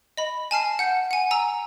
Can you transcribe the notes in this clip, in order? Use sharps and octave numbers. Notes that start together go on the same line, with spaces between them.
D#5 B5
G#5 A5 F6 C7
F#5 G6
F#5 G#5
G#5 A#5 E6